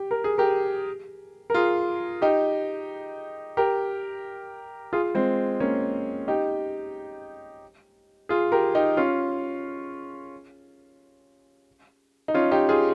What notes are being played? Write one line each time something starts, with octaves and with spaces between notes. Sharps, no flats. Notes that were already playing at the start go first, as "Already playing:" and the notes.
Already playing: G4
A#4
G#4
G4 A#4
A#4
F4 G#4
D#4 G4
G4 A#4
F4 G#4
G#3 C4
A#3 C#4
D#4 G4
F4 G#4
G4 A#4
D#4 G4
C#4 F4
D#4
C#4 F4
D#4 G4
F4 G#4